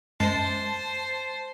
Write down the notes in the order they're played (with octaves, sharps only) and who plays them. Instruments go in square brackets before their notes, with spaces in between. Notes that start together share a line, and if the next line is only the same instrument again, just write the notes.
[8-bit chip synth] F#2 G#3 C7 [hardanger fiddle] C5 [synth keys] A5